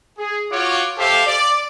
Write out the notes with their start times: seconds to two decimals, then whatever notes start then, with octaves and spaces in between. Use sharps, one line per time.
0.18 G#4
0.51 F4 F#4 C#5 D6
0.98 G4 A4 C5 E5 F5
1.26 D5